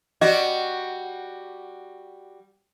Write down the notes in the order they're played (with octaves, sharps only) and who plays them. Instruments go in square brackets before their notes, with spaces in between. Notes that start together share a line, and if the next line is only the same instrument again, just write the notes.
[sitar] G3 F#4 [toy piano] D#5